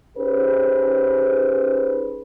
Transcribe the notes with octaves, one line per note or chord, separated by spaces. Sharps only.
C#4 D#4 G4 G#4 B4 C5